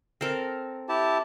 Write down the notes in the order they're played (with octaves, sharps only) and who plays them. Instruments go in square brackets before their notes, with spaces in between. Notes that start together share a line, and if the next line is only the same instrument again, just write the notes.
[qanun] C4 A4 A#4
[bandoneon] E4 G4 A5